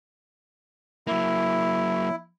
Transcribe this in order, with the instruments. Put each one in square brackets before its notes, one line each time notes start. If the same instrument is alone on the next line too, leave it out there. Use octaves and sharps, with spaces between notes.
[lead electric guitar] F#3 A#3 [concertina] E4